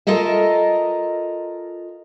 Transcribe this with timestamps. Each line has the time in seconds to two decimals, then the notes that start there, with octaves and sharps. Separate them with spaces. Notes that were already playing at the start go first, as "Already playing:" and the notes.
0.07 F4 A4 A#4 D#5 E5